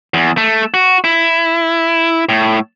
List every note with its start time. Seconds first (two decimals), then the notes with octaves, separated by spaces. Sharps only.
0.14 E2
0.37 A3
0.74 F#4
1.04 E4
2.29 A2